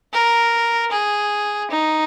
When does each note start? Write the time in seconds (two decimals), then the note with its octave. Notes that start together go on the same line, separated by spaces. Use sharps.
0.13 A#4
0.92 G#4
1.71 D#4